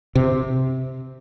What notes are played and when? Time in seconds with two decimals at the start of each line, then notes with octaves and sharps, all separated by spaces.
0.15 C3